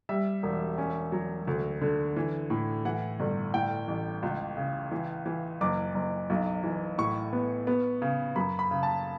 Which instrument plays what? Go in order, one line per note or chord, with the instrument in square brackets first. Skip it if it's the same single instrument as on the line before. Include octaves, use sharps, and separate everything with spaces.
[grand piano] G3 E5
E1
C#4
F#3
D2
D3
E3
A2
E3 F#5
G1
A2 G5
A1
C#2
C#3
E3
E3
F#1 D6
F#1
B1
E3
A2 C#6
B3
B3
C#3
F#2 B5
B5
C#3
A5